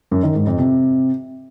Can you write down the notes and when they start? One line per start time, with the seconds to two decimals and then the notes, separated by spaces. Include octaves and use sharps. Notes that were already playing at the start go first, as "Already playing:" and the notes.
0.11 F#2
0.23 D#3
0.35 G#2
0.47 F2
0.58 C3